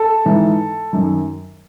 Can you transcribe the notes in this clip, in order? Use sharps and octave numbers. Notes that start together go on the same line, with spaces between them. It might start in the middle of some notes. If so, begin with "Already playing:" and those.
Already playing: A4
G#2 E3
F#2 D#3